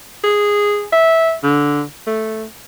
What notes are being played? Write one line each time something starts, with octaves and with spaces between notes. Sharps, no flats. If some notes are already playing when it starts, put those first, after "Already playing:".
G#4
E5
D3
A3